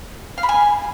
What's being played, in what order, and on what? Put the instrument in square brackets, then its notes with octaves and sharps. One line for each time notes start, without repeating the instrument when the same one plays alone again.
[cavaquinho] F5
B5
G#5